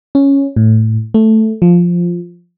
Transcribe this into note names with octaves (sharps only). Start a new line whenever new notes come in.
C#4
A2
A3
F3